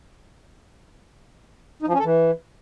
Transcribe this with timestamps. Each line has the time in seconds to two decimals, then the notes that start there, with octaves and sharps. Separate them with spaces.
1.82 D#4
1.88 F3
1.94 C#4
1.99 A4
2.05 E3